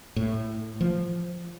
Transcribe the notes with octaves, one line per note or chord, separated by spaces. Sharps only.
A2
F3